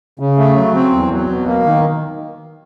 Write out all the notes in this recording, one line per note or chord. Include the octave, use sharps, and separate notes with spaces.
C#3
A3
F#3
C4
E2
F#3
B2
A#3
D#3